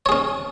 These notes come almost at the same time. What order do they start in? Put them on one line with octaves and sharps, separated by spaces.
C#5 G#4 C#4